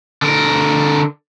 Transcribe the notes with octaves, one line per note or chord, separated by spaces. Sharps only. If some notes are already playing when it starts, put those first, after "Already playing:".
D3 A#4